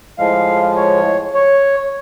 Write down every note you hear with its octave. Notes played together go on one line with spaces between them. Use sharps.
A2 F3 G#3 F5
C#5
C#5